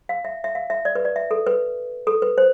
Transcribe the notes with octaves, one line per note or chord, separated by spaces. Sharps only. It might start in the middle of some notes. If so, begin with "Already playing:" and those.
F5
E5
E5
F5
E5
D5
B4
D5
E5
A4
B4
A4
B4
C5